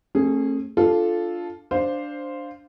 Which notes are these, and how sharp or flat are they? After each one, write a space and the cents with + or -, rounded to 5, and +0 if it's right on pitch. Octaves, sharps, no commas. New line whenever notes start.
A3 +25 C#4 -45 G#4 +0
D4 +0 F4 +0 A4 -10
D4 +0 C5 +0 F5 +0